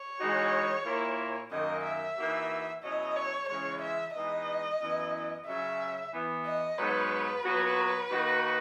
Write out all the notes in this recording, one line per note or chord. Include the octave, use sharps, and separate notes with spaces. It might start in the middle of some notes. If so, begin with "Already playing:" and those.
Already playing: C#5
E3 G#3 D#4 F#4
A#2 A#3 E4
F#2 D#3 A#3 D#5
E5
E3 A#3 D#4 F#4
B2 F#3 C#4 E4 D#5
C#5
C#3 E3 G#3 C#5
E5
E3 G#3 B3 D#4 D#5
F#2 E3 B3 E4
C#3 F#3 C#4 E5
E3 B3 E4
D#5
G#2 F#3 B3 B4
A#2 F#3 B3 F#4
D#3 A#3 D#4 F#4